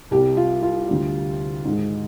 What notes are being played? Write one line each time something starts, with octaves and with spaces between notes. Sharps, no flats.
C2 C3 G3 G4
F4
F4
D2 D3 G3
G#2 D#3 G#3